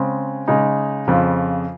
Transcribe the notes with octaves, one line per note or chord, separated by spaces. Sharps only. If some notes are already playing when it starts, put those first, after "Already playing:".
Already playing: C#3 G#3 C4
C#3 G#3 D#4
F2 C#3 F3